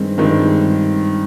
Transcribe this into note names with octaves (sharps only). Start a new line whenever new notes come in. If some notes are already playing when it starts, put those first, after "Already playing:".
Already playing: G2 D#3 G#3 C4
G2 D#3 G#3 C4